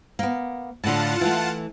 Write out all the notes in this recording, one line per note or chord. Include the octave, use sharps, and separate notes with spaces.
A#3 B3
A2 D3 F4 F#5 A5
E3 A3